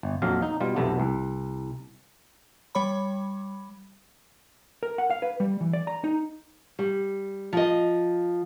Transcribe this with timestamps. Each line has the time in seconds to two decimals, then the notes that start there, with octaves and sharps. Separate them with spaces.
0.03 G1
0.22 A#1 F2 F#3 F5
0.42 D#4
0.60 B2 G3 F4
0.76 B1 F2 C3 A3 B3
1.00 C2
2.75 G3 C#5 B5
4.83 A#4
4.98 F#5
5.10 F5
5.22 B4
5.40 G3
5.61 E3
5.73 D5
5.87 A#5
6.04 D#4
6.79 G3
7.53 F3 D#5